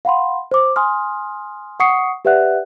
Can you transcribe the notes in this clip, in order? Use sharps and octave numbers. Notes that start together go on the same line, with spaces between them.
F5 F#5 B5 C6
C5 D6
G#5 C6 D#6 F6
F#5 C#6 D#6 C7 C#7
G4 B4 D5 E5 F#5 F#6